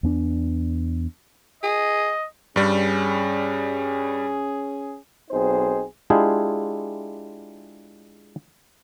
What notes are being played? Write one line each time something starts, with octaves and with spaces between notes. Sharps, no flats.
E2 B3 D4
G#4 D#5
G2 G3 C#4 G#4
B1 C4 D#4 G#4 C5
G#3 D4 E4 F4 G4 G#4